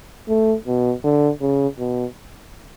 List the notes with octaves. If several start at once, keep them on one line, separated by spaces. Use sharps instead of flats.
A3
B2
D3
C#3
B2